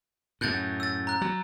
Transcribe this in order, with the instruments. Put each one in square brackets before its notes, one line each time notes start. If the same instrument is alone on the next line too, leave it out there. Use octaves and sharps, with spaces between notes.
[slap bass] F#2 A2 [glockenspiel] F#6 G6 A6
[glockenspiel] E6 A6
A#5 F#6
[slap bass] F#3